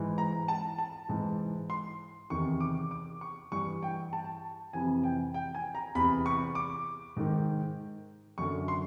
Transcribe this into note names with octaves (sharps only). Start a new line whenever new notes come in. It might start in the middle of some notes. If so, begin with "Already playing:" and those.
Already playing: G#2 E3
A#5
A5
A5
G#2 E3
C6
E2 C3 D#3 C#6
D6
D6
C#6
G2 E3 C#6
G5
A5
F2 C3 E3 G#5
G5
G5
G#5
A#5
E2 C3 E3 B5
C#6
D6
G#2 D#3
F#2 D3 C#6
C6